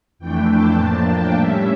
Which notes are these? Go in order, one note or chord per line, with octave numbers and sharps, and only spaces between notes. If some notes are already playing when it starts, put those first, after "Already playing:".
F2 E3 A3 D4 G5
A5
A2 F3 A#3 D4 A5
G5
A2 G3 C#4 E5